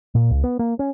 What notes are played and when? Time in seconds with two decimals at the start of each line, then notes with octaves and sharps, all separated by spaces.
0.15 A#2
0.30 C#2
0.44 B3
0.59 A#3
0.79 C#4